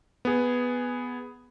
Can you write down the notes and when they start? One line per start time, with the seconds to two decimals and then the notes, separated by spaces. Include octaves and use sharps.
0.25 B3 G#4